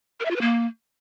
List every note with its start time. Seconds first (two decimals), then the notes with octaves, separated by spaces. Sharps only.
0.20 A#4
0.25 E5
0.31 F4
0.36 B4
0.41 A#3